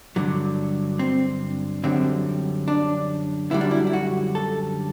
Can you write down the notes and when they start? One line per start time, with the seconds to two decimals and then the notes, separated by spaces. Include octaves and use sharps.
0.16 G2 D3 F#3
0.99 C4
1.84 F#2 D3 G3 C4
2.68 D4
3.51 F#2 D3 G3 E4
3.61 D4
3.71 E4
3.87 E4
3.93 F#4
4.35 A4